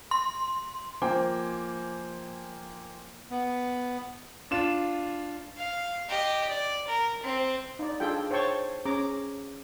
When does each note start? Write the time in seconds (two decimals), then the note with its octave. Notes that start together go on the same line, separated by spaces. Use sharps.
0.11 C6
1.02 F3 A#3 C5 G5 G#5 D6
3.31 B3
4.51 D4 F4 E7
5.57 F5
6.09 G4 D#5
6.49 D5
6.87 A#4
7.22 C4
7.79 D#4 D5
8.00 D4 F4 G#4 A4 G5
8.31 C5 C#5 G5 A5 C#6
8.85 C#4 G#4 A#5 D6